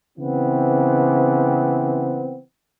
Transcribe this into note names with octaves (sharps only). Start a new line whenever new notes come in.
C#3 E3 B3 C4